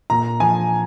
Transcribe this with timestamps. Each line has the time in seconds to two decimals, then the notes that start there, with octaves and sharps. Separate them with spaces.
0.10 A#2 A#5
0.40 F3 G#5